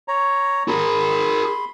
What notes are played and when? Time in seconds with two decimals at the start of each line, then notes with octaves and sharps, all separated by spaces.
0.08 C#5 A#5
0.68 G#4 A#4 B5 C6